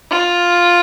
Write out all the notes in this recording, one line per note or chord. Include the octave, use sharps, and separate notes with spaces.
F4